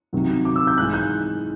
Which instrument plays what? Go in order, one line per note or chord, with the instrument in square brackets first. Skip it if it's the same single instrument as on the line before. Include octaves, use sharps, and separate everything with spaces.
[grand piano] C3 D#3 F#3
D6
E6
G6
G#2 E3 G#3 F#6
G6